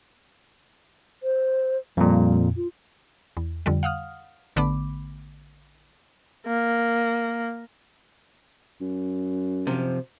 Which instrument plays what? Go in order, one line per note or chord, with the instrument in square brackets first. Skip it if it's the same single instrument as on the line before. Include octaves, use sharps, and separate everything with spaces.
[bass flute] C5
[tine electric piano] F2 A#2 [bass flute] G3
[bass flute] F4
[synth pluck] E2
F2 D3 G3
F5 F#5 D#6 F6
A1 D3 A3 B3 B5 D6
[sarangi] A#3
[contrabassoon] F#2
[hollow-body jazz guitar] C3 F3